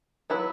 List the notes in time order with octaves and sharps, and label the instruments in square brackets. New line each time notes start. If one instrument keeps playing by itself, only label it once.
[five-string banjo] F#3 B3 E4 B4